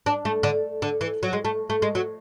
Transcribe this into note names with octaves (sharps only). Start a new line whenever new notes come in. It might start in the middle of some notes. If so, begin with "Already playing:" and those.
D4
A3
D3
D3
E3
F#3
G#3
A3
A3
G#3
F#3